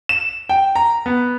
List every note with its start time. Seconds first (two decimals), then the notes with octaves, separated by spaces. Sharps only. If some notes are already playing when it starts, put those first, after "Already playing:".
0.09 E7
0.49 G5
0.75 A#5
1.06 B3